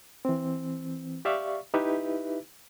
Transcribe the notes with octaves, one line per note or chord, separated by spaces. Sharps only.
E3 C4
G4 D5 E5 F5 C#6
D#4 E4 G4 B4 E5